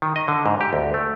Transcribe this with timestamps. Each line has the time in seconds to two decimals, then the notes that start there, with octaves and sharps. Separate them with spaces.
0.02 D#3
0.16 D#5
0.28 D3
0.46 G#2
0.61 G4
0.73 D2
0.94 A3